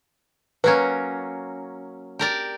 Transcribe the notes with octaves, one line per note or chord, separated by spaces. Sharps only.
F#3 A#3 C#4 B4 G#6
G4 A#4 D5